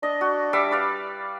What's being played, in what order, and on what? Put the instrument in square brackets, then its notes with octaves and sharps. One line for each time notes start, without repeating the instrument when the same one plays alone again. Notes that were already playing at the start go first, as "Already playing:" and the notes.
[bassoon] D4 [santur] D#5
[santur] F#4
G3 E5 D6
B4 D5 F5